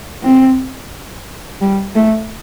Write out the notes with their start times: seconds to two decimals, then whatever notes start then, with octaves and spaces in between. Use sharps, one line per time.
0.23 C4
1.61 G3
1.95 A3